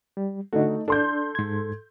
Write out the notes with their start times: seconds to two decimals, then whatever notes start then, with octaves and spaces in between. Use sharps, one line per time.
0.17 G3
0.53 D3 A3 D#4 F#4
0.88 D4 A4 C6 G6
1.35 G#2 G#6